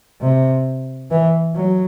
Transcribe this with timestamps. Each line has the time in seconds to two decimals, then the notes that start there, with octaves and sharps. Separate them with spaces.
0.21 C3
1.11 E3
1.55 F#3